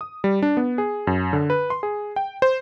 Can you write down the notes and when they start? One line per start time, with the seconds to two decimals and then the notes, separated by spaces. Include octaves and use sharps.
0.01 D#6
0.24 G3
0.42 D4
0.57 B3
0.78 G#4
1.07 F#2
1.33 D3
1.50 B4
1.70 C6
1.83 G#4
2.16 G5
2.42 C5